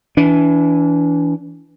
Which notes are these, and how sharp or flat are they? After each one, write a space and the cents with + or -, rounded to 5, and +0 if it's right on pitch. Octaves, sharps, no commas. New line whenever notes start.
E3 +0 D4 -35